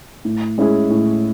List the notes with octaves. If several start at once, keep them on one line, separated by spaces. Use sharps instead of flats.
A2
G#3 C#4 E4 G#4
A2